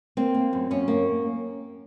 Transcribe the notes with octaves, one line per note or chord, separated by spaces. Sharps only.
A#3 C4
A#3
F#2
F#2 C#4
A#3